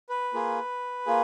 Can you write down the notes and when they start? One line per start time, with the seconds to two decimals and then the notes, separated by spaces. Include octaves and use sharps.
0.09 B4
0.34 A#3 F4 G#4
1.06 A#3 F4 G#4